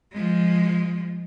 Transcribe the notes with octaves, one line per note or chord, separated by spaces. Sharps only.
F3 G#3